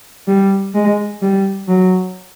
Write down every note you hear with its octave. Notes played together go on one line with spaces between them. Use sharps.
G3
G#3
G3
F#3